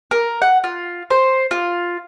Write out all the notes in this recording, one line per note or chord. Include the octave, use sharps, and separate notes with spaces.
A#4
F#5
F4
C5
F4